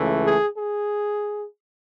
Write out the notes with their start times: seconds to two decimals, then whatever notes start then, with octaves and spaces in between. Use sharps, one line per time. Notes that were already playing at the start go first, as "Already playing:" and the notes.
Already playing: C#2 C#3 E3 A3
0.24 G#4
0.55 G#4